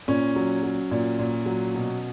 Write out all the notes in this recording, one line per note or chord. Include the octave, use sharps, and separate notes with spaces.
A#2 C#4
F#3
F#3
A#2
A#2
F#3
B2